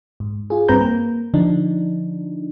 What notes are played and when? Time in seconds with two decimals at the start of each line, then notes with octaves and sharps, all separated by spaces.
0.20 G#2
0.50 F4 G#4
0.69 G2 C4 B4 A#5 G6
0.81 A#3
1.34 D3 F3 D4 D#4